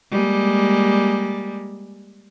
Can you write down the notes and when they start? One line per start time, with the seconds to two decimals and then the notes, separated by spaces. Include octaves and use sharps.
0.11 G3 G#3 A#3